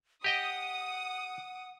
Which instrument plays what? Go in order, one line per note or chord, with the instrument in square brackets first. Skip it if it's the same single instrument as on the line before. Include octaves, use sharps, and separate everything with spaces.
[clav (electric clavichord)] G4 D#5 G5 [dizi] F#5 [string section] D#6